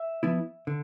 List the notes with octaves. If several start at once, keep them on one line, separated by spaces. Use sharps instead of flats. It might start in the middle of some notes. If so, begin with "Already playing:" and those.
Already playing: E5
F3 B3 E4
D3